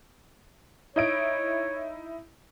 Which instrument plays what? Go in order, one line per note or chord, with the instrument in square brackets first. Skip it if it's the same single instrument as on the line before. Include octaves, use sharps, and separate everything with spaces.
[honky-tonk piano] D#4 E4 D7 [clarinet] C#5